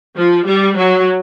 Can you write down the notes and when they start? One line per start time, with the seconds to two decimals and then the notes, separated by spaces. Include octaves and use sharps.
0.16 F3
0.46 G3
0.77 F#3